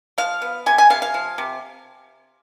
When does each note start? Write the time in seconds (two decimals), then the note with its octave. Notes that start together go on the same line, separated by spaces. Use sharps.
0.18 F3 F5
0.42 B3
0.66 C3 G#5
0.78 G#5
0.90 C3 F5
1.02 F5
1.14 F3
1.38 C3